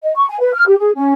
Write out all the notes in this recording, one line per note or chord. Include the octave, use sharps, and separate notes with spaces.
D#5
C#6
G#5
B4
F6
G4
G#4
C#4